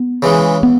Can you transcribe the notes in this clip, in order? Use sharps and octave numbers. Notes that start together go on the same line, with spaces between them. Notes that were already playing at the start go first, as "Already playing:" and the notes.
Already playing: B3
C#3 E3 G#3
B3